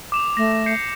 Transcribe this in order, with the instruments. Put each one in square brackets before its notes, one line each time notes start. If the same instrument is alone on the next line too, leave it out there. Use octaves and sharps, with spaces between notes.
[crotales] D6 E7 F7
[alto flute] A3 [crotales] A#6
[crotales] G6 C7 C#7